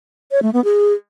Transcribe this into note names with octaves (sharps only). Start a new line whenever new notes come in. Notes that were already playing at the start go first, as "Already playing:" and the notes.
C#5
A3
B3
G#4